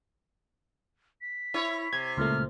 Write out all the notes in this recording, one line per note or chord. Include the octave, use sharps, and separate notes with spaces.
B6
E4 C#5
C3 G#6
C#2 A#2 A3 F6